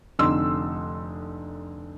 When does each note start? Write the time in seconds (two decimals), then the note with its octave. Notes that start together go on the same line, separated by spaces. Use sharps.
0.19 F1 D3 D#4 C6 E6